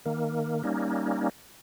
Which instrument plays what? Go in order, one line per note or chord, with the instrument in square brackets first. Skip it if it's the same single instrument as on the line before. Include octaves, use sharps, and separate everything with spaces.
[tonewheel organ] D#3 A#3
G3 A#3 C#4 D#4